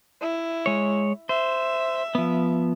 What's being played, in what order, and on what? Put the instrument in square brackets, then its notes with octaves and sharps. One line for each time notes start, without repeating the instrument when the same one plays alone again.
[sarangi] E4
[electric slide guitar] G#3 C#5
[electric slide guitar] C5 [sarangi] E5
[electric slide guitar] F3 B3